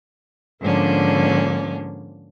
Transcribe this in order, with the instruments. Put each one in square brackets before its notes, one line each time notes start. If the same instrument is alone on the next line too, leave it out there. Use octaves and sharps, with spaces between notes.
[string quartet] G#2 D3 F3 A#3 C#4 D4